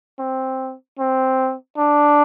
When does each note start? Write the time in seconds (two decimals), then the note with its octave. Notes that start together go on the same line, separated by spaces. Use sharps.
0.19 C4
0.99 C4
1.78 D4